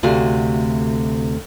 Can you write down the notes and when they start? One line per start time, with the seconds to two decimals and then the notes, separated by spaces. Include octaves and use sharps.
0.03 D2 C3 A3 F#4 F5